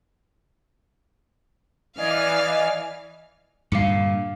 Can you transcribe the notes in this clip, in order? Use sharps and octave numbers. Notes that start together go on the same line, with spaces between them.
E3 D5 D#5 F5 G#5 F6
G2 A#2 D3 F5 D6 C#7